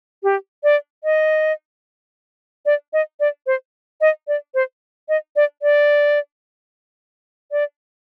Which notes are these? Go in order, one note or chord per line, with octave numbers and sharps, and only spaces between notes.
G4
D5
D#5
D5
D#5
D5
C5
D#5
D5
C5
D#5
D5
D5
D5